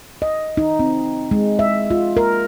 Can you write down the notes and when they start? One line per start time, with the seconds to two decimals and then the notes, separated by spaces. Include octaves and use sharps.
0.22 D#5
0.57 D#4
0.79 C4
1.31 G#3
1.59 E5
1.90 F4
2.17 A#4